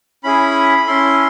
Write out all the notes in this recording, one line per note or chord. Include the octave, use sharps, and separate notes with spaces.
C#4 E4 G#4 B5
C#4 E4 A4 C6